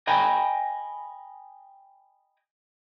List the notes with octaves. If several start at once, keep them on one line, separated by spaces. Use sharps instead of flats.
D#5 G5 G#5 A#5 B5